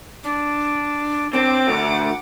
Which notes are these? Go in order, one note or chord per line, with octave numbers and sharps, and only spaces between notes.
D4
C4 D4 D6
D2 F#5